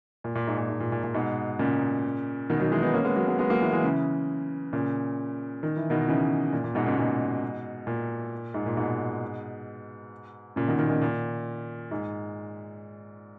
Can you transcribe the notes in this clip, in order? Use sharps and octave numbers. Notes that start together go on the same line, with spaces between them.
A#2
A#2
G#2
A#2
G#2
A#2
A#2
A#2
G#2 B2
A#2 C#3
B2 D#3
D#3 F#3
E3 G#3
B3 D#4
A#3 C#4
G#3 B3
F#3 A#3
G#3 B3
G#3 B3
F#3 A#3
E3 G#3
E3 G#3
C#3 E3
A#2 C#3
D#3
E3
B2 D#3
C#3 E3
A#2
A#2
G#2 B2
A#2 C#3
G#2 B2
A#2
G#2
A#2
G#2 B2
A#2 C#3
B2 D#3
B2 D#3
A#2 C#3
A#2
G#2